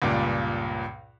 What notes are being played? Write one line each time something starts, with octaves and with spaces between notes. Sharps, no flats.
C#2 G2 A#2